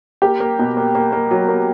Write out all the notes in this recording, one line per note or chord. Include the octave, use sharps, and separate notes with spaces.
A#3 G4
A#3
B2
A#3
A#3
A#3
F#3
A#3